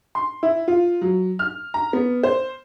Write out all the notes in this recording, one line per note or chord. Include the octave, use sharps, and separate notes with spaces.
C6
E4
F4
F#3
F6
A#5
B3
C5